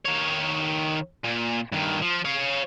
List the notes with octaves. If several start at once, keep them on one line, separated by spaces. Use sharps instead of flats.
D#3 C#5
A#2
G2 D#3
F3
C#5 F5